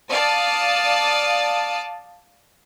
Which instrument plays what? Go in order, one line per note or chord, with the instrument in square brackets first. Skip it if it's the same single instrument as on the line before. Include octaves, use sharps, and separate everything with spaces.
[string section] D5 F5 A5 D#6